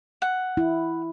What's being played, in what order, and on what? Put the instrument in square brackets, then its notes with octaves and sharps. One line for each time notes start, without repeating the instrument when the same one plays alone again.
[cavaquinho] F#5
[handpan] E4